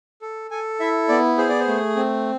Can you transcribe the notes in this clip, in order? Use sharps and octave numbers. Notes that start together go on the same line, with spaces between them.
A4
A4 G#5
E4 E5
B3 D5
G#4 C5
D5
C5
A3
C4